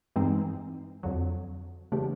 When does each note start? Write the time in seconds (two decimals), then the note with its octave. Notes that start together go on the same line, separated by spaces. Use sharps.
0.16 G2 E3 G#3 C4 D#4
1.03 F2 D3 F#3
1.92 C#3 E3 A3 D4 G4